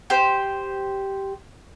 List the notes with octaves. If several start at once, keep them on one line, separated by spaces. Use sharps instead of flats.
G4 C5